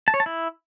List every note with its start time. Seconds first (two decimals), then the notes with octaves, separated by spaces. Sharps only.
0.08 A5
0.14 C#5
0.20 A5
0.26 E4